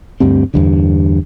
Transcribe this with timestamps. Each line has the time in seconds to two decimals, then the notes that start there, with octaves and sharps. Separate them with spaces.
0.20 D2 G2 G3 C4
0.54 E2 G2 D3